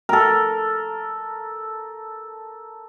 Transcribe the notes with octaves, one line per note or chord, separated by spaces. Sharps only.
A4 A#4